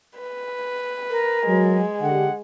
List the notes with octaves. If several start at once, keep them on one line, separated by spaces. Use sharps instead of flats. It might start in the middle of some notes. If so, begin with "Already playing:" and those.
B4
A#4
F#3 G#3
D3 G4 F#5